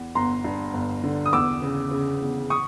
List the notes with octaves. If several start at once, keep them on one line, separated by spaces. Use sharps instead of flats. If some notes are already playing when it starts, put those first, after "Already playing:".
Already playing: E2
G1 A#5 C6
G2
G1
D3
D#6
E2 D6 E6
C#3
C#3
E2
C#6 D#6